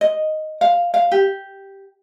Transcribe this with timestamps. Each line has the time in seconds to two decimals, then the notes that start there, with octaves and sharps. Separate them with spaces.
0.01 D#5
0.61 F5
0.94 F5
1.12 G4